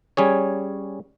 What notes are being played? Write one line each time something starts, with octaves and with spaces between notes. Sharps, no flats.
G3 C#4 G#4 C#5